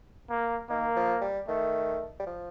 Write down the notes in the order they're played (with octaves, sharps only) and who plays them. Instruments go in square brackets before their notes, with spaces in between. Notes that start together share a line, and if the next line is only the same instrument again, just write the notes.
[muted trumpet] A#3
[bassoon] D#3 [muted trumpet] A#3
[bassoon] F3
G3
[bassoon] D#3 [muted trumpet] A3
[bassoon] G3
F3